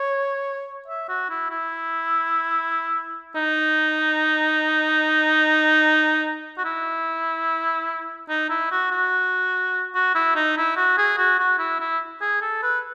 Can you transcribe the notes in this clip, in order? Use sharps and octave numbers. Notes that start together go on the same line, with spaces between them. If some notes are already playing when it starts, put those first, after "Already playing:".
Already playing: C#5
E5
F#4
E4
E4
D#4
F#4
E4
D#4
E4
F#4
F#4
F#4
E4
D#4
E4
F#4
G#4
F#4
F#4
E4
E4
G#4
A4
B4